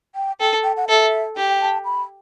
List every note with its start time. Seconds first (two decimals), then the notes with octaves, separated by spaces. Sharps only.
0.15 G5
0.40 A4 G5
0.64 G5
0.77 F#5
0.89 A4 E5
1.36 G4 G5
1.61 A5
1.85 B5